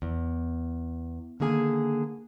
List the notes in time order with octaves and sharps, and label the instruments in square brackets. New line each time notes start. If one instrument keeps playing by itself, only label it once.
[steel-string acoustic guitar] E2
D3 D#3 A#3 G#4 G#5